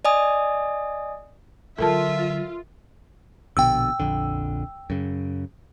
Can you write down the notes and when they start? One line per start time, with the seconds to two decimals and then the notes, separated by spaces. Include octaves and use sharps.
0.05 D5 D#5 G#5 D#6
1.78 D3 F#3 F4 A4 A#4 E5 A5
3.57 A#1 B2 D3 G5 E6
4.00 A#1 F2 D3
4.90 F#2 C#3